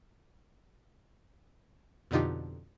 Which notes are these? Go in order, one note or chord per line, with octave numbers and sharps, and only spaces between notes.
F2 B2 D3 D#4 F4 G4